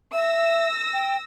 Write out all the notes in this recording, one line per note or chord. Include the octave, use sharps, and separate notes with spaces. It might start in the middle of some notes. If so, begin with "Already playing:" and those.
E5 E6 A#6
G5